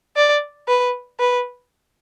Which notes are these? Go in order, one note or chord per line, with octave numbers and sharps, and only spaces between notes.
D5
B4
B4